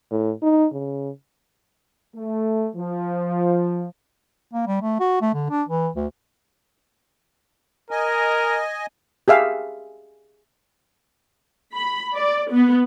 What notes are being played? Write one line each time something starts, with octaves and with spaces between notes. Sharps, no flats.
A2
D#4
C#3
A3
F3
A#3
G3
A3
F#4
A3
D3
D4
E3
D2
A#4 D#5 G#5
G4 G#4 E5 F5
B5
D5
B3